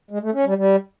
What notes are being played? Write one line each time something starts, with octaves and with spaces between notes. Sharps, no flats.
G#3
A3
C#4
G3
G3